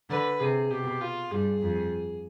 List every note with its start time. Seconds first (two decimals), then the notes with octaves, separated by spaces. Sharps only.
0.10 D3 B4
0.40 C3 G#4
0.71 B2 G4
1.01 F4
1.31 G2 G#4
1.62 F2